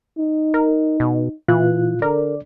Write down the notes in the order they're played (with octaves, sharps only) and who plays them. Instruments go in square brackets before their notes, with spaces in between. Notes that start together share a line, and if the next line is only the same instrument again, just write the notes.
[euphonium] D#4
[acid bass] A#4
B2
[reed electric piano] A#2 F4 F#6 [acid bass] E3
[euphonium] D3 [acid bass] A#4 [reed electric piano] D5